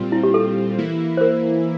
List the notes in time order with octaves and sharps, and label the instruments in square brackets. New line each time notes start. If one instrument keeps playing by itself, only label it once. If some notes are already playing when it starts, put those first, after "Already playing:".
Already playing: [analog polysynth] A#2 G3 C4 F4
[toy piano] E4
G4
A4
[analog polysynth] E3 A#3 E4
[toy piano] C5
A#4